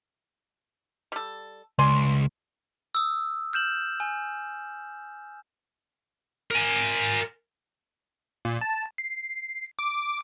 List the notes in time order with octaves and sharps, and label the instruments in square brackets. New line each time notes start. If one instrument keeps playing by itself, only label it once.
[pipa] G3 A4
[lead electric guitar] C#2 [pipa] D5 G#5 C6
[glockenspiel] D#6 E6
F6 G6 E7 F#7
G#5
[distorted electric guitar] A#4 G#5
[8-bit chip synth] A#2
A5
C7
D6